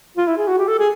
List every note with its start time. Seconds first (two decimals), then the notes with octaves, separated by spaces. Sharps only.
0.17 F4
0.28 E4
0.37 G#4
0.47 F#4
0.58 G4
0.68 A4
0.78 G#4